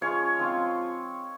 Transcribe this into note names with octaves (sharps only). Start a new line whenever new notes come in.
F3 G#3 C#4 F4 C#5
F3 C4 F4